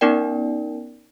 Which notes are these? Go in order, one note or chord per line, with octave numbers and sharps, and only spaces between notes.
B3 C#4 D#4 A#4 D5 G5